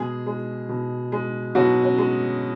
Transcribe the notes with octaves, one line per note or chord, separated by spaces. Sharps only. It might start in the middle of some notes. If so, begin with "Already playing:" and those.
Already playing: B2 G#3 G#4
G#3
B2
G#3
B2 F#3 F#4
C#4
G#3